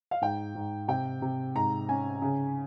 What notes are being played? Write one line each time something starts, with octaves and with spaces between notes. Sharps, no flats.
F5
G#2 G5
G#2
C3 G5
C3
G#2 A#5
C#4 G#5
C#3